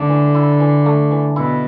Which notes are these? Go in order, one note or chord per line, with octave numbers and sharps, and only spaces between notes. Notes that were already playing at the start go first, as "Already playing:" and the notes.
Already playing: D3 A3
E3
E4
E3
A3
E3
B2 E4